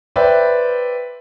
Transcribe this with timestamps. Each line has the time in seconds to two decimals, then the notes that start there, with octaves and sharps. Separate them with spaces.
0.16 B4 C5 D5 E5 G5